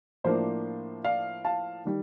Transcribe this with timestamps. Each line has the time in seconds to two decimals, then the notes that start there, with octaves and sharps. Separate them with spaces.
0.24 A2 F3 A#3 D4 C5
1.04 D5 F5
1.45 F5 A5
1.85 D#3 G3